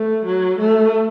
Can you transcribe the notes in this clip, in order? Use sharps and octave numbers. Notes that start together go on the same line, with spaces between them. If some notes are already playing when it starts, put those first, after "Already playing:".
Already playing: A3
F#3
A3